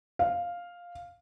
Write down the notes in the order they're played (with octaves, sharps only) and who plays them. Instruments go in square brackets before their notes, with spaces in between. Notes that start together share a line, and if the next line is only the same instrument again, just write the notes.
[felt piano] F5